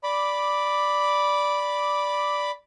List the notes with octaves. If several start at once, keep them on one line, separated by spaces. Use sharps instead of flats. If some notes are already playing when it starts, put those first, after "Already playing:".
D5 B5 D6